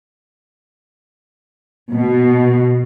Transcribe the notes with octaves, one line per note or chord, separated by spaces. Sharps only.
B2